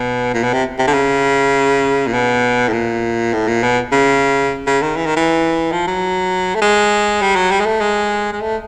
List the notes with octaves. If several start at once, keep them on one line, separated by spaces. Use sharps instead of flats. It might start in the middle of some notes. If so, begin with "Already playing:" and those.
Already playing: B2
A#2
B2
C3
C3
D3
C#3
A#2
B2
A2
A#2
A2
A#2
B2
C#3
C#3
D#3
E3
D#3
E3
F3
F#3
A3
G#3
G3
F#3
G3
G#3
A3
G#3
G#3
A3